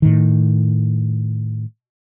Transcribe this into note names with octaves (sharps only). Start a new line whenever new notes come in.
A2 D#3